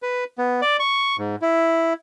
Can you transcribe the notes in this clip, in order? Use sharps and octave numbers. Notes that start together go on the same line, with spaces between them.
B4
B3
D5
C#6
G#2
E4